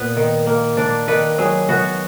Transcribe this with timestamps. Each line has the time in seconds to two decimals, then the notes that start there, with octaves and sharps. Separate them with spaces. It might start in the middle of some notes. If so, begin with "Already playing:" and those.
Already playing: A#2 B3 B4
0.16 D#3
0.47 A#3
0.77 D4 D5
1.08 D#3 B4
1.38 F#3 G#4
1.69 B3 F#4